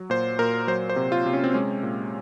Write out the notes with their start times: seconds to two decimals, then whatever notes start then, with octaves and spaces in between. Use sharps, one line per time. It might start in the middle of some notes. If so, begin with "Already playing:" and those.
Already playing: F#3
0.10 A#2 C5
0.39 A#2 A#4
0.67 F#3 C5
0.89 C5
0.96 C3
1.12 F4
1.26 C3
1.33 C#4
1.44 C4
1.54 G#3 C#4
1.83 A#2